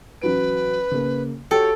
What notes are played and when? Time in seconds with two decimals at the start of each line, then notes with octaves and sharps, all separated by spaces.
0.22 A1 F#3 B4 D7
0.91 C#3 A#3
1.51 F#4 G4 A4 C#5 G5